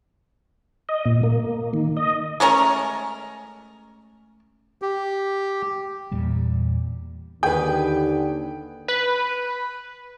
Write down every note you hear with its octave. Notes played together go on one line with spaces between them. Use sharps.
D#5
A#2
A#3
D#3
D#5
G#3 A3 C#4 A#4
G4
E2 A#2 G3
D#2 D3 G#4 B4 G5
B4